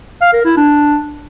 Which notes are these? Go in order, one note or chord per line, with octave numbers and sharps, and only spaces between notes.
F5
A#4
E4
D4